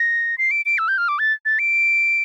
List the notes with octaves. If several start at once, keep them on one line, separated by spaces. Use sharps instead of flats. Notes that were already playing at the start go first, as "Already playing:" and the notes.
Already playing: A#6
C7
D7
D7
E6
G6
F6
D6
A6
A6
D7